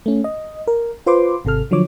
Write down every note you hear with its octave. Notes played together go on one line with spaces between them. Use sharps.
A3 C#4
D#5
A#4
F4 B4 C5 C6 D6
G#1 C3 A4 F6
D3 F3 F#3 C#5 D6